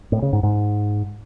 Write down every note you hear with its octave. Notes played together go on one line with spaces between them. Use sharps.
A2
C#3
G#2
G#2